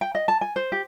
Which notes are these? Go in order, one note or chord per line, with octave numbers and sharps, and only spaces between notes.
G5
D#5
A5
G#5
C5
G4